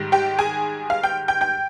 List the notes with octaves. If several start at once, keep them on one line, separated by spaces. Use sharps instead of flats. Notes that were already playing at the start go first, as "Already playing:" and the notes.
Already playing: G#2 D#3 G3
G4 G5
G#4 G#5
F5 F6
G5 G6
G5 G6
G5 G6